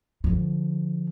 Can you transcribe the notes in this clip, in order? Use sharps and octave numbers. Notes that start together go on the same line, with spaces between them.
D3 F3